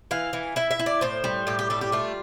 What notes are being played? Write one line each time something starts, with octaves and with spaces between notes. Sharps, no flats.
E3 F5
E3
E4 E5
E5
E4
D5
A2 C5
G3
A2 G4
G4
G3 A4
G4
A3 F4